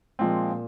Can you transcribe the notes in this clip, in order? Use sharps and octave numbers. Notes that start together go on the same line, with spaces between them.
A#2 F3 G#3 C4
A#2